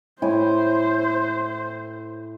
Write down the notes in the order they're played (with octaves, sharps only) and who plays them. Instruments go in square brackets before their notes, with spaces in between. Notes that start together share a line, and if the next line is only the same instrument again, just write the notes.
[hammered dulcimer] A2 E4 G#5 [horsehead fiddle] C5